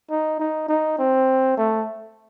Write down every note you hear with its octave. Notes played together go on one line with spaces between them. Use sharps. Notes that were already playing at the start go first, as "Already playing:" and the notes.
D#4
D#4
D#4
C4
A3